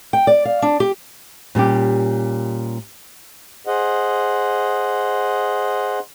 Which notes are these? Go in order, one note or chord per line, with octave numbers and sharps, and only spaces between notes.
G5
D5
F5
D4
G4
A#2 G3 C#4 G4
G#4 C5 D#5 F#5